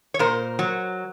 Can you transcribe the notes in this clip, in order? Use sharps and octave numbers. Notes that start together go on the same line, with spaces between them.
C#5
A#2 A#4 C5
F#3